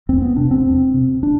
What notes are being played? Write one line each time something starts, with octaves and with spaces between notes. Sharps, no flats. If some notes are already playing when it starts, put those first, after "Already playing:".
E2 C4
B3
C3 D4
C4
E2
C3
D4